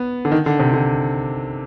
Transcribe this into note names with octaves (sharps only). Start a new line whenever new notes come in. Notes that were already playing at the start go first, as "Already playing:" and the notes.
Already playing: B3
D3
D#3
D3
C3
D3